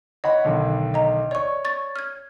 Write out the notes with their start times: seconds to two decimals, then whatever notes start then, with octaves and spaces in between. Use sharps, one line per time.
0.24 C#5 D#5 F#5 B5
0.44 B1 D3 D#3
0.94 D#5 A#5
1.31 C#5 D5 C#6
1.65 C#6 A6
1.96 F6 G#6